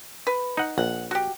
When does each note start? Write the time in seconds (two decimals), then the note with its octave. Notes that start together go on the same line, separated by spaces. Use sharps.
0.27 B4
0.57 D#4 F#5
0.78 A#1 F#5
1.11 F#4 G4